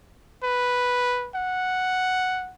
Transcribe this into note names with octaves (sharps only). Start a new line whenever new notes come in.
B4
F#5